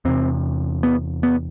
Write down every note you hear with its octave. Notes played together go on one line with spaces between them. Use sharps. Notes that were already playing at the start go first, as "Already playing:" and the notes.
E2 C3 C4
B3
B3